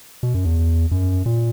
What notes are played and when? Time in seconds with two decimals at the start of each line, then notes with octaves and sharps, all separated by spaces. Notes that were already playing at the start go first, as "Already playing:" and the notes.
0.23 B2
0.34 F#2
0.45 E2
0.91 F#2
1.26 A#2